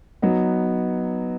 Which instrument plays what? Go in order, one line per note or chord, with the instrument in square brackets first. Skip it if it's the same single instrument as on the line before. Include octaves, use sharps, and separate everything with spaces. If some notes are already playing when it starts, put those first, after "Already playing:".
[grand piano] F#3 B3 D#4